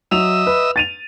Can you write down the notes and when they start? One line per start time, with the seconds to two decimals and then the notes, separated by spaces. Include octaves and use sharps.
0.11 F#3 D#5 E5 E6 F7
0.47 B4
0.76 A6 D#7 F7